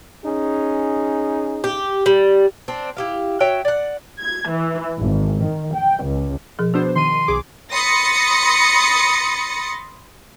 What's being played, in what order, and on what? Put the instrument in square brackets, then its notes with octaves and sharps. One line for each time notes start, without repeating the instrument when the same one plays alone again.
[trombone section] C#4 D#4 G#4
[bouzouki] G4
G3
C4 D4
E4 G4 F5
F#4 C#5 E5 G5
D5 F#5
[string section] G#6
E3
G#1
D#3
G5
C#2
[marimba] B2 F3 G#4
[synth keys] B3 D4 C5 [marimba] F#4
[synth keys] D#3 D#7 [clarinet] C6
[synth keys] B1 G#4 D6
[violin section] B5 C6 D#6 A6 A#6 C#7